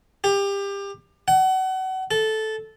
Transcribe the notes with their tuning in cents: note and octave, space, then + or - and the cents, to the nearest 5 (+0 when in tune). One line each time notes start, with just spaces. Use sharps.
G4 +25
F#5 +30
A4 -10